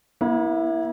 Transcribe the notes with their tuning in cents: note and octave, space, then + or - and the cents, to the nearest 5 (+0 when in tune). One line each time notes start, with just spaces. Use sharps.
A#3 +40 E4 -5